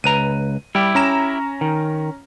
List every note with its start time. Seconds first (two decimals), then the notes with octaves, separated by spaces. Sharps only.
0.04 C#2 B4 A#5 D#7
0.75 G3 E4 G4
0.95 C#4 A#5 E7
1.61 D#3